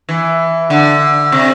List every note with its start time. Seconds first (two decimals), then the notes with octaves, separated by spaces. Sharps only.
0.09 E3
0.70 D3
1.32 C3